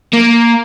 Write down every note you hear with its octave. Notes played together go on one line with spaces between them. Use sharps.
A#3